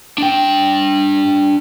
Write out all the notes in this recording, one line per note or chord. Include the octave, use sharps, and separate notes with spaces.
D4 G5